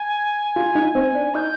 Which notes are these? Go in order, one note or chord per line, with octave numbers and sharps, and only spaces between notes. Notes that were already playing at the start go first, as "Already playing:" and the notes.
Already playing: G#5
F4
D#4
C4
D4
D#4 G6